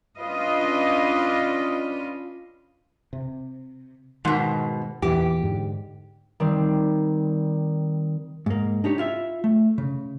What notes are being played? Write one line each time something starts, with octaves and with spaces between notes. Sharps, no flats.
C#4 D4 F4 B4 D#5
C3
G#2 B2 D#3
E2 A#2 E3 G4
G#2 D3
D#3 G3 C4
G#2 A#3
D4 D#4 G4 C#5
E4 F4 E5
A3
C#3